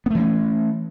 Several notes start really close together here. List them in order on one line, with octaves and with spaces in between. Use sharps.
B3 A3 E3 C#4